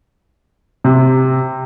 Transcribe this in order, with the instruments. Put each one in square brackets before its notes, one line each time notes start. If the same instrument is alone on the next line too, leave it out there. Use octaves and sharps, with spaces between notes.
[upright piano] C3